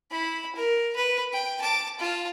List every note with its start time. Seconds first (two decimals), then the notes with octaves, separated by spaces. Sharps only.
0.11 E4 B5
0.56 A#4
0.96 B4
1.33 G5
1.61 A5 D6
2.00 F4 A5